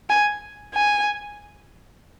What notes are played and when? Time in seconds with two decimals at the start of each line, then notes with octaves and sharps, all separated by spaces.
0.09 G#5
0.74 G#5